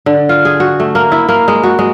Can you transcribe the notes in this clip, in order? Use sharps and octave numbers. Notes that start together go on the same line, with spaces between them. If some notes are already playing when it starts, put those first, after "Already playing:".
D3
F4
G#4
F#4
A3
A#3
E4
A#3
G#3
F#4
G#3